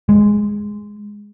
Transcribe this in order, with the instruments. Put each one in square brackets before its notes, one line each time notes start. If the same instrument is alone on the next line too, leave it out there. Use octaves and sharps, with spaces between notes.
[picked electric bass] G#3